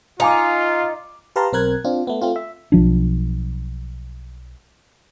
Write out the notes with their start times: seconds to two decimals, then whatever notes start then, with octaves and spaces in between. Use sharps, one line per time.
0.20 D#4 F4 F5 G#5 D6
1.36 G4 B4 F5 A5 A#5 C6
1.53 B1 C4 A#4 F#6 G#6
1.85 C4 D4 F4
2.07 A3 B3
2.22 A3 C4 F4
2.36 E5
2.72 B1 F3 D4